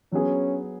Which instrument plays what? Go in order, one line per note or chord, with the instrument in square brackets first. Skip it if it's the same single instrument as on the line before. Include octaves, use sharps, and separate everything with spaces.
[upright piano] F#3 B3 G#4 [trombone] C#4